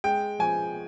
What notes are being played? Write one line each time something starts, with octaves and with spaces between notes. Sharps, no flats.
G#3 G5
F3 G#5